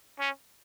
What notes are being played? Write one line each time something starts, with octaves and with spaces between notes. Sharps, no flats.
C#4